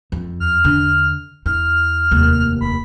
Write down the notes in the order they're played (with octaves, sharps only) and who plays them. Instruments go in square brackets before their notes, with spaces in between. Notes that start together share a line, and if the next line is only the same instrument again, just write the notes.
[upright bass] F2
[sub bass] E2 [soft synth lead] F6
[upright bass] D3 D4
[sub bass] E2 [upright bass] E4 [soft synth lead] F6
[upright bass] F1 D#2
[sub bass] D#1 [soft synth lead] B5